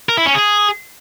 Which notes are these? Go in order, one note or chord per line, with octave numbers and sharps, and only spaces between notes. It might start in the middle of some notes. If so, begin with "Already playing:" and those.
A#4
E4
C#4
G#4